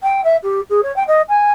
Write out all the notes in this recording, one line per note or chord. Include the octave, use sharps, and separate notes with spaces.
G5
E5
G4
G#4
C#5
G5
D#5
G#5